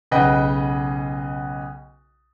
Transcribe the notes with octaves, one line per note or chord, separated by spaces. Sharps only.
B1 C#3 B4 D#5 F#5 G5